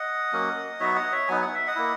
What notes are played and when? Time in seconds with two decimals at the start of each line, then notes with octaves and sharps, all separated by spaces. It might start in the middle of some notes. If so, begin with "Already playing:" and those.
Already playing: D#5 F#5
0.32 F#3 A#3 C#4
0.80 F#3 B3 D#4 F#4 C#5 E5
0.96 D#5 F#5
1.12 C#5 E5
1.28 F#3 B3 D#4 G#5
1.42 F#5
1.55 E5
1.67 D#5 F#5
1.75 A#3 E4